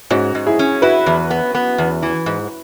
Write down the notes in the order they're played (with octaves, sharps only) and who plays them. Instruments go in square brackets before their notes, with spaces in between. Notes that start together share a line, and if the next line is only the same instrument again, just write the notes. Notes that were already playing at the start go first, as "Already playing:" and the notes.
[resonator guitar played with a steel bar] G#2 [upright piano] C#4 F#4
[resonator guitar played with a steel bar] G#2
[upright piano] E4 G#4
[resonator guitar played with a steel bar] C#4
[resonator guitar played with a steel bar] E4 [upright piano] F#4 B4
[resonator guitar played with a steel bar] E2
B3
B3
E2
E3
G#2